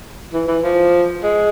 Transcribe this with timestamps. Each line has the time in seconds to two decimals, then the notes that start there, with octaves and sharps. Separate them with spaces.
0.33 E3
0.48 E3
0.63 F3
1.23 G#3